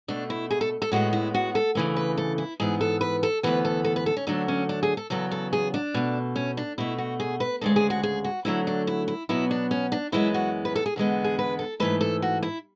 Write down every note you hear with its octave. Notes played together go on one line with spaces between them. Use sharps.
B2 A3 D4
E4
G#4
A4
A4
A2 G#3 B3 F#4
E4
F#4
A4
D2 C#3 E3 A3
B4
A4
E4
G#2 E3 B3 G#4
A4
B4
A4
D2 C#3 E3 B3 B4
A4
A4
B4
A4
C#4
D2 D3 F#3 A3 D4
C#4
D4
G#4
A4
E2 C#3 F#3 B3 A4
A4
G#4
D4
B2 A3
C#4
D4
B2 A3 E4
F#4
G#4
B4
D2 C#3 G#3 A4
G#4
F#4
G#4
F#4
D2 D3 F#3 A3 E4
D4
E4
E4
B2 F#3 B3 E4
D4
C#4
D4
F#2 E3 G#3 B3 E4
F#4
B4
A4
G#4
E2 D3 G#3 B3
G#4
B4
A4
G#2 E3 A3 B4
A4
F#4
E4